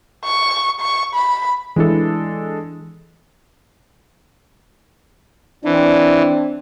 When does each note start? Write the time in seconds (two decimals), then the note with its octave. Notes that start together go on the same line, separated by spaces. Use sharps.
0.24 C#6
0.80 C#6
1.14 B5
1.76 E3 G#3 D4 E4 A4
5.65 E3 C4 D4